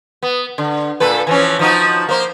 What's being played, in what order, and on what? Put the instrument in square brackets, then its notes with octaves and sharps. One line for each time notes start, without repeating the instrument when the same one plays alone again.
[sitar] B3
D3
A#2 A4 B4
E3 F3 C#4
F3 D#4 F#4
A#3 C5